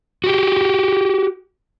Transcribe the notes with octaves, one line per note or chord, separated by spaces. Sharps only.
F#4 G4